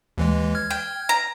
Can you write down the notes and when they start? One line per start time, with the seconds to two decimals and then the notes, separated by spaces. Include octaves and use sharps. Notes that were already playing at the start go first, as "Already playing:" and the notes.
0.18 D#2 E3 G#3
0.55 F6 G#6
0.71 G5
1.09 A#5